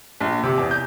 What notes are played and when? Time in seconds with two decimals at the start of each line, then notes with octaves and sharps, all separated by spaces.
0.21 A#1
0.43 C3
0.57 E2
0.71 G6